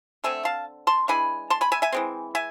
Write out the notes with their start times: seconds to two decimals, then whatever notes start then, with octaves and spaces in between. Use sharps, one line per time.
0.24 D3 A3 C4 E5 G#5
0.45 F5 A5
0.87 A5 C6
1.08 E3 G#3 D4 G#5 B5
1.50 A5 C6
1.61 G#5 B5
1.72 E5 G#5
1.82 E5 G#5
1.93 E3 G#3 C4
2.35 E5 G#5